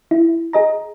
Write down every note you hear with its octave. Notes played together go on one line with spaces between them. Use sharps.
E4
G#4 D#5 A#5